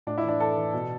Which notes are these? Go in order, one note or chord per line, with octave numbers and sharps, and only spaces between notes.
A2 D4
E4
E3
D4
E3 A4
E3
B2